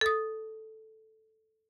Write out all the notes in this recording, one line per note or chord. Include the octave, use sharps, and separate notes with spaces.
A4 D#6